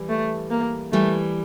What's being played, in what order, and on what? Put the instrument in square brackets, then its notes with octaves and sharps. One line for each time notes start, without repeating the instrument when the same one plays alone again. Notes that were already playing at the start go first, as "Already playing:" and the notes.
Already playing: [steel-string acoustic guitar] E3 G3
[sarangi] A3
A#3
[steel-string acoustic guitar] E3 G3 [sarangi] A3